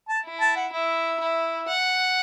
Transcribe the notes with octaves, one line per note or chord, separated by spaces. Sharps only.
A5
E4
A5
F#5
E4 E5
E4
F#5